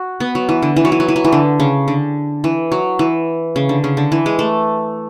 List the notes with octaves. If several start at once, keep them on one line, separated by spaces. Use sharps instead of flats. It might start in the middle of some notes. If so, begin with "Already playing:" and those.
Already playing: F#4
B3
F#3
E3
D3
E3
F#3
E3
F#3
E3
F#3
E3
D3
C#3
D3
E3
F#3
E3
C#3
D3
C#3
D3
E3
G#3
A3